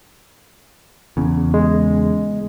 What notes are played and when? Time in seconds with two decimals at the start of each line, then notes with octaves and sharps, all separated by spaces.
1.17 E2 C#3
1.54 G#3